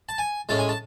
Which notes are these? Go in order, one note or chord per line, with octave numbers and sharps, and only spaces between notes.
A5
G#5
A2 G#3 C#4 A5
G#5
A5